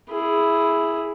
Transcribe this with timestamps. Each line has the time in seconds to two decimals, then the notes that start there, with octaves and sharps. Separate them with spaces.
0.11 E4 G#4